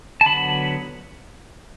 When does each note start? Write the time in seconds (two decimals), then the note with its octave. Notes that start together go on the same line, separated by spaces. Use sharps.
0.21 A5
0.26 D3 F#3 B3 B5